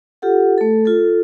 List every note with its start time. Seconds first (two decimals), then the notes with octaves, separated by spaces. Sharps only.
0.22 F4 G4 A4 F#5
0.58 A3 A4
0.85 F4 A4